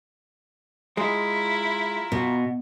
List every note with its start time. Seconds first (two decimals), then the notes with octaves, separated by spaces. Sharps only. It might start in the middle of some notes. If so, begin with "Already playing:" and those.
0.97 G#3 E4 F4 A#5
2.12 B2